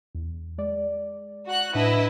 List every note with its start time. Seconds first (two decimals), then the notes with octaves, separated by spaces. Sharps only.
0.15 E2
0.58 G#3 D5
1.46 F#4 F#6
1.75 A2 D4 E4 B4 D#5 A5